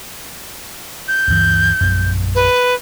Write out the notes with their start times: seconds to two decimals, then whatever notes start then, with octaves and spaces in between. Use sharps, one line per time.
1.08 G6
1.27 D2 G2 E3
1.81 A#1 F#2
2.35 B4